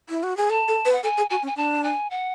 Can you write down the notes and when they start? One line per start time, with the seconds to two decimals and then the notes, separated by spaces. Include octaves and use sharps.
0.10 E4
0.23 F#4
0.37 G#4
0.50 A4 A5
0.68 A4
0.85 B4
0.92 F#5
1.03 A4 G#5
1.17 G#4
1.30 F#4 G#5
1.43 C#4
1.47 G#5
1.56 D4 A5
1.84 G#5
2.11 F#5